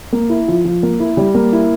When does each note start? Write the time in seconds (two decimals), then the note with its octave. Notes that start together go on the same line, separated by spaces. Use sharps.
0.13 A#3
0.30 E4
0.48 F3
0.65 F3
0.83 A#3
1.00 E4
1.17 G3
1.34 A#3
1.53 E4